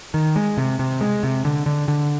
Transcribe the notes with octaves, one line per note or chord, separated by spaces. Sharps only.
D#3
G#3
C3
C3
G#3
C3
D3
D3
D3